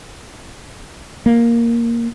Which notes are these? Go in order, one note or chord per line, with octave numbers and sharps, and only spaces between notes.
A#3